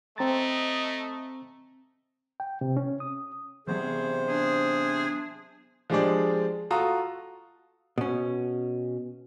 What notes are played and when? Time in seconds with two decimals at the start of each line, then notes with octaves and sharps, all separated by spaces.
0.18 A3 C4 D#5 A#5 A6
2.40 G5
2.61 C3
2.77 C#4
3.00 D#6
3.67 C3 E3 F#3 B3 G#4 C5
4.28 D4 G#4
5.90 F3 G#3 D4 G4 G#4 D5
6.71 F4 F#4 A4 A#5 D#6
7.98 B2 C#4